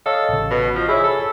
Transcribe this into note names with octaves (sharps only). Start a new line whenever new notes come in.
A4 C#5 D#5 F5
A1 C#3
B2
F3
E4 G#4 C#5
A4